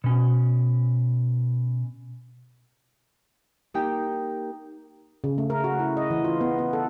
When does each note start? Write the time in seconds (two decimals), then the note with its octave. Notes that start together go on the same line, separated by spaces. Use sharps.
0.04 B2 C#4
3.74 A#3 D#4 G4 G5
5.24 C#3
5.38 A3
5.50 A#4
5.64 F#4
5.79 E4
5.97 D#5
6.11 E3
6.24 F4
6.41 B3
6.58 B3
6.73 A4